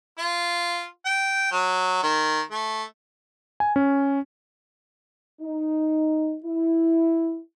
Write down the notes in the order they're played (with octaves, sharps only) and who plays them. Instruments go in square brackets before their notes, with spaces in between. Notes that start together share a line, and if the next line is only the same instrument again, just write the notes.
[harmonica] F4
G5
F#3
D#3
A3
[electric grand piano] G#5
C#4
[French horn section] D#4
E4